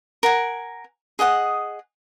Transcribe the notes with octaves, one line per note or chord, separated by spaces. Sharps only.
A#4 F#5 G#5
G#4 D#5 F#5 D#6